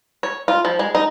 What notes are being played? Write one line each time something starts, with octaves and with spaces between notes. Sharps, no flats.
C#5
F4
F3
G#3
D#4